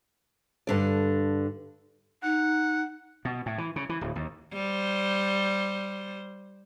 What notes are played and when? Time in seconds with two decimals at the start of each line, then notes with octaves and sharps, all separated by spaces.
0.67 G2 D3 D5
2.23 D#4 F#5
3.25 B2
3.46 A2
3.58 E3
3.76 C#3
3.89 E3
4.01 D1
4.15 D#2
4.53 G3 C5